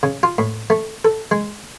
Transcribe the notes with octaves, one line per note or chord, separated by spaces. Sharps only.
C#3
F4
A2
A3
A4
G#3